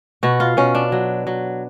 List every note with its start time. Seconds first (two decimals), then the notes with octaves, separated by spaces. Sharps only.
0.23 B2 F#4
0.40 F4
0.57 B2 C#4
0.75 D4
0.92 F#3
1.27 F#3